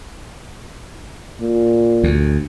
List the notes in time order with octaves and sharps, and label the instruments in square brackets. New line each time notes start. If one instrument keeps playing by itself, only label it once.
[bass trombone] A#2
[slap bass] D2